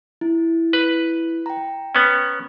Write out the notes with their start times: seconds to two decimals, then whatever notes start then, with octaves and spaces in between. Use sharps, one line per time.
0.21 E4
0.73 B4
1.46 G5 A#5
1.95 B3 C#4